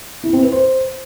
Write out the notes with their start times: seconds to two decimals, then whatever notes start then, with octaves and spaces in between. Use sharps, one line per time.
0.24 E4
0.33 C4
0.43 B4
0.52 C5